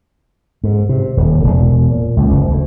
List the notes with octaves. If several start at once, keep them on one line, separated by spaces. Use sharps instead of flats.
G#2
C3
D#1
E1
A#2
C#2
F#1
D2